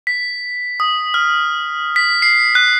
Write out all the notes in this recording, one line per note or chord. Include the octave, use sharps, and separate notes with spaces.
B6
D#6
F6
B6
C7
F#6